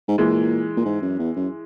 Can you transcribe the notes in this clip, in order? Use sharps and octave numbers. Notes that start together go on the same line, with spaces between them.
G#2
A#2 E3 G#3
A#2
G#2
F#2
E2
F#2